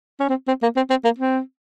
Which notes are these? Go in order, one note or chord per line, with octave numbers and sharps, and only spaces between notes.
C#4
C4
C4
A#3
C4
C4
A#3
C4